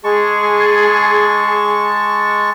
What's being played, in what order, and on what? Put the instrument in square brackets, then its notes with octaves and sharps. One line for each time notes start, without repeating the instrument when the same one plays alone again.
[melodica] G#3 A5 C#6 [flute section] G#4